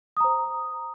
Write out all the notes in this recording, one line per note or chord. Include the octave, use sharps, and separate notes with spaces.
C5 A#5 D#6